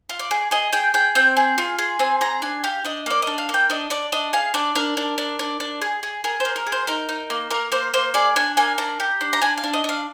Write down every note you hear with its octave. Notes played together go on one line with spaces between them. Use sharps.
F4
D5
G#4
G#4 D#5
G#4 G5
G#4 G5
C4 G5
G#4
F4
G#4
C4 G#5
G#4 A#5
D4 G#5
G4 F5
D4 D#5
A#3 D5
D4 D#5
F5
A#3
G5
D4 D#5
D4 D5
D4 D#5
G#4 F5
D4 D5
D4 A#4
D4
D4
D4
D4
G#4
G#4
G#4 A#4
A#3 C5
A#4
G#4
C5
D#4 A#4
D#4
A#3
A#3 A#4
A#3 C5
A#3 C5
G#4 D5
D4 G#5
A#3 G#5
D4 A#5
G4
D4
A#5
D4 G#5
F5
D4
D#5
D4 F5